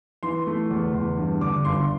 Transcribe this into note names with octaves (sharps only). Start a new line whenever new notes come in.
E3 C6
A3
E2
E2
G2
D3 D6
G1 C6